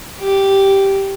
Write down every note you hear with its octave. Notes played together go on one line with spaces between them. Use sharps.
G4